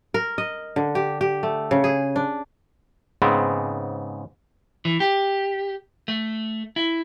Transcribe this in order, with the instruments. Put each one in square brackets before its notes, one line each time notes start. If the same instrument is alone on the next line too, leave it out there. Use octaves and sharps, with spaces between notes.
[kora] A#4
D#5
D3
G4
G4
A3
C#3
G#4
D4
[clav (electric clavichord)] G#2 C#3 B3 C4
[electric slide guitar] E3
G4
A3
E4